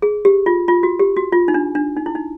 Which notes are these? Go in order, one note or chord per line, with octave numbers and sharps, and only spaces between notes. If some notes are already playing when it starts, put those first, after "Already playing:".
G#4
G4
F4
F4
F#4
G4
F#4
F4
D#4
D4
D4
D#4
E4
D#4